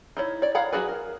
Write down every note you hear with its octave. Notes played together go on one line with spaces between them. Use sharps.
D#4 E4 C#5
C#5 D5
C#5 F5 F#5 A#5 B5
F#3 F#4 G#4 B4
A#4